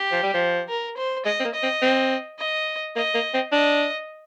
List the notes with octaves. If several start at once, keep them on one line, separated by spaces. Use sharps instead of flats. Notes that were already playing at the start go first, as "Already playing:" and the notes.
Already playing: G4
F3
G3
F3
A#4
C5
G#3 D#5
C4
A#3
D#5
C4
C4
D#5
A#3 D#5
A#3
C4
D4 D#5